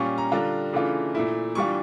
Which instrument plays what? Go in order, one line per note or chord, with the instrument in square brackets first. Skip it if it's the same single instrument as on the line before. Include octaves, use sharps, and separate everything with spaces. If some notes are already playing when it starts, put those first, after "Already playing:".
Already playing: [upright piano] A#2 G3 C#4 F4 C#6
A#5
D3 G3 D4 F4 A#5
C#3 E3 A3 D4 F4
A#2 A3 E4
E3 G3 D4 F4 C#6